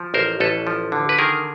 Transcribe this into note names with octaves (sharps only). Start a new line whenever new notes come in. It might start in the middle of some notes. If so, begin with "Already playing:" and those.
Already playing: F3
A1 A#4 C5
A1 A4 B4
F3
D3
B4
D#3 G#4 A#4